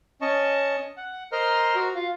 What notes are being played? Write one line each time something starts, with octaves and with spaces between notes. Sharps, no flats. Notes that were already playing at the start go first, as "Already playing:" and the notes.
C#4 D#5 A5 C#6
F#5
A#4 C5 D#5 A#5 C6 F6
F#4
F4 F5